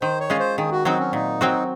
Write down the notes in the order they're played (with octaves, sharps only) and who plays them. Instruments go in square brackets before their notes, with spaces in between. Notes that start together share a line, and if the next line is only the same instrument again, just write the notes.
[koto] D#3 [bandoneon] C5
[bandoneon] C#5
[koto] G#3 C#4 F4
[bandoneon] C5
[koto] D#3 [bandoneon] G#4
[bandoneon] F#4
[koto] F#3 C4 F#4 [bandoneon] D#4
[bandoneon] C#4
[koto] A#2 [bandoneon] D#4
[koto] F#3 C4 F#4